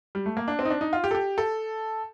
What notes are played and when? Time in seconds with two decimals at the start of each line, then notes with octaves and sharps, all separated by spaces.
0.15 G3
0.26 A3
0.37 A#3
0.48 D4
0.59 C4
0.65 D#4
0.70 D4
0.81 D#4
0.93 F4
1.04 G4
1.11 A4
1.15 G4
1.38 A4